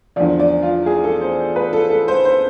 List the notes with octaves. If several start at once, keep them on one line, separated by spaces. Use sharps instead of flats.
E2 D3 F3 D5
D5
F4
G#4
A4
C5
B4
A4
A4
C5
C5